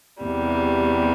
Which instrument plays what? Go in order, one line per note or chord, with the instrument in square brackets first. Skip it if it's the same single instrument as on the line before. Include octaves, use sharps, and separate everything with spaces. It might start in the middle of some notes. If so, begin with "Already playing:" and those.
[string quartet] E2 C3 G3